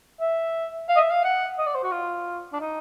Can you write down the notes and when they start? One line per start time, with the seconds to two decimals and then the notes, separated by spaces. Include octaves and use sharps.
0.20 E5
0.89 F5
0.96 D#5
1.00 E5
1.11 F5
1.24 F#5
1.58 D#5
1.66 D5
1.75 C5
1.83 F#4
1.91 F4
2.53 D4
2.61 D#4